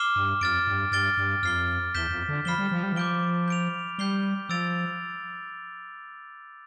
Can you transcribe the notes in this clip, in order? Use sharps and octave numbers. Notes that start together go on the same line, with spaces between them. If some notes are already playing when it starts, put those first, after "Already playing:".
Already playing: D6 F6 C7 E7 G7
G2
F2 F6 A6 D7
G2
G2 F6 A6 D7 G7
G2
F2 F6 C7 G7
E2 G6 B6 E7 G7
F2
D3
F3 B5 F6 C7 E7 G7
G3
F3
G3
E3
F3 D6 G6 D7 G7
G6 D7 F7
G3 G6 C7 G7
F3 E6 A6 D7 F7